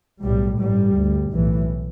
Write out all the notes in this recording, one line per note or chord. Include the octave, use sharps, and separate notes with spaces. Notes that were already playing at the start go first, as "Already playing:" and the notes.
B1 A2 G3
A1 G2 G3
D2
B1 A2 E3